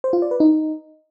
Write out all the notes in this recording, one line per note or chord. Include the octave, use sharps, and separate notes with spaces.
C5
F4
D5
B4
D#4